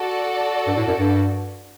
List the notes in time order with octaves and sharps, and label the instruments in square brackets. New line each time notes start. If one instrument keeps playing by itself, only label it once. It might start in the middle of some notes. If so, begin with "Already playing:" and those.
Already playing: [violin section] F#4 A4 D5
[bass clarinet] G2
A2
F#2
G2